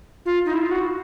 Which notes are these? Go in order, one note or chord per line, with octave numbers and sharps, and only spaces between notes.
F4
D#4
E4
F4
F#4